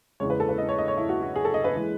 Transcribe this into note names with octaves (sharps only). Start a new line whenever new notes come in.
E2 C#3 G#3 C#5
B4
A4
B4
D#5
C#5
D#5
C#5
E4
F#4
F#4
G#4
A4
D#5
B4
E3 G#3